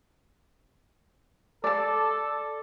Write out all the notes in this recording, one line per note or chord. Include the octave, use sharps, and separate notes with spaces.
A4 D5 A5